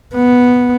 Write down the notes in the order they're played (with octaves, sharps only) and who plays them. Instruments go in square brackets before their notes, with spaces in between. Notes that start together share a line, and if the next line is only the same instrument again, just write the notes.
[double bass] B3